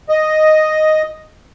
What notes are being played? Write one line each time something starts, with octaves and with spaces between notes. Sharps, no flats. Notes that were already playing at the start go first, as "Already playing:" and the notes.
D#5